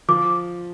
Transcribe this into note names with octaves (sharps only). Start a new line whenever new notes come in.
F3 D6